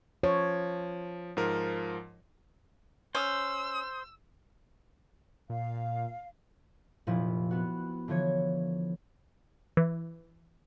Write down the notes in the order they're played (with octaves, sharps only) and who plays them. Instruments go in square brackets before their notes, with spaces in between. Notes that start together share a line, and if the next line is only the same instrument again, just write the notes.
[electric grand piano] F3 [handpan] C#5
[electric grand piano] G#2 F3 A#4
[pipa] C#4 [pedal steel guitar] C5 [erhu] E6
[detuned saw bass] A#2 [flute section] F5
[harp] F1 A#2 F3 E4
B3 F#4
D3 E3 F3 C#5 G#6
[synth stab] E3